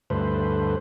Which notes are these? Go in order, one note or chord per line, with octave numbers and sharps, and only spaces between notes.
D2 G2 A3 B4 C5